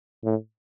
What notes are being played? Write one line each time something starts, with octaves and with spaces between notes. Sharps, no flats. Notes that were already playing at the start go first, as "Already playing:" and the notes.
A2